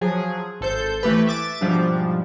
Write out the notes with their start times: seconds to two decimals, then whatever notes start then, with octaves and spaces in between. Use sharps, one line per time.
0.01 F3 F#3 G#4
0.61 G#1 A4 C5 G6
1.03 E3 A3 G4 B4
1.27 E5 D6 A6
1.61 G#2 B2 F3 G3 D4